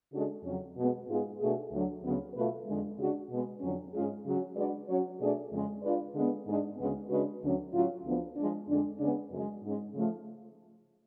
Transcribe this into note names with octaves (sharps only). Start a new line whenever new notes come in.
C#3 G#3 D4 F#4 A4
F2 C#3 F#3 C#4
B2 G#3 B3
G#2 G#3 B3 F4 G#4
B2 A3 D4 G#4
D2 D3 F#3
D2 C#3 F#3 B3
B2 A3 F4 B4
F2 D3 G#3
C#3 G#3 D4 F#4
B2 G#3 B3
F2 D3 F#3 C#4
G#2 G#3 C#4 F4 G#4
C#3 F#3 C#4 F#4
G#3 D4 F#4 B4 D5
F#3 C#4 F#4 C#5
B2 A3 D4 G#4 D5
F2 C#3 G#3
G#3 D4 F4 B4 D5
D3 G#3 B3 D4
G#2 G#3 D4 G#4
D2 C#3 G#3 B3
C#3 G#3 D4 F#4 B4
D2 D3 F#3 C#4
A2 F#3 C#4 F4
D2 D3 F3 B3
F3 G#3 D4
F2 D3 G#3 D4
C#3 G#3 B3 D4 G#4
F#2 C#3 G#3
G#2 G#3 C#4
C#3 F3 A3